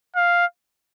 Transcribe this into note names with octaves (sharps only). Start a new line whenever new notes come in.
F5